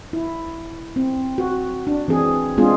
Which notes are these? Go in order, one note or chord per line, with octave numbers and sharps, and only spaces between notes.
E4
C4
F#4
D4
E3 C4 G#4
G#3 B3 C4 D4 F4 G#4